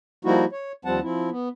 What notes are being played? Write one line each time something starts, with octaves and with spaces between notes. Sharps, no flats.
F3 G3 A#3 D#4 E4 F#4
C#5
D#2 F3 G3 C4 F#5 A5
F3 C4 E4
B3